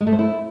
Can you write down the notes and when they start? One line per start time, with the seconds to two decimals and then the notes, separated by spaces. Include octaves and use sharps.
0.01 G#3
0.07 A3
0.13 C5
0.19 E4